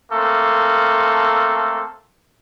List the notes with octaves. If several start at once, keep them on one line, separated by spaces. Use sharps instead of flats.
A3 A#3 C4 A4